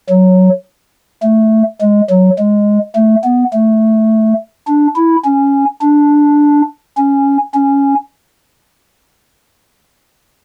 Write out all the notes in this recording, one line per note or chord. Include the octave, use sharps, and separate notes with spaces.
F#3
A3
G#3
F#3
G#3
A3
B3
A3
D4
E4
C#4
D4
C#4
C#4